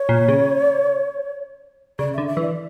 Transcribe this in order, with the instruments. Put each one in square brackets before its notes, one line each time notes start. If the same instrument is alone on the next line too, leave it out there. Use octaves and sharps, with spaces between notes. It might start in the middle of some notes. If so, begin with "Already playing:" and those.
Already playing: [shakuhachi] C#5
[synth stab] A#2
C#3
[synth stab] C#3 [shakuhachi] D5
[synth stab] D3 [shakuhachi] E5
[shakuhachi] E5
[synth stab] E3
[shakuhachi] D5